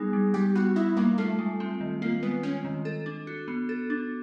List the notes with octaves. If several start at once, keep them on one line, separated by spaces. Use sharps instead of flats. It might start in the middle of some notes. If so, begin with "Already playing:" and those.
Already playing: G3 B3 D#4 G#4
G3
G3 G4
B3 F#4
D#4 E4
G3 A#3
A3 F4
G#3
C4
D#3
A#3 F4
G#3 B3
C4 C#4
D#3
A4
D4
F#4
B3
A4
D4